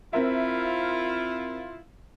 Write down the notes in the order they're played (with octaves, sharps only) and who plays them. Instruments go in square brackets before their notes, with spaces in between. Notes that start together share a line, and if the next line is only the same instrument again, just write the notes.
[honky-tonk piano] C4 A#4 E5 [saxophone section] E4 F4